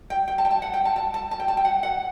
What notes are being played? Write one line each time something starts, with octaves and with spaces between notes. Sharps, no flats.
G5
G5
A5
G5
A5
F#5
G5
A5
A5
A5
A5
G5
A5
G5
F#5
F#5